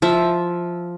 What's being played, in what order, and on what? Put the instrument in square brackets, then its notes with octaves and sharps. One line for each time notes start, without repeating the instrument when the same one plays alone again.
[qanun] F3 E5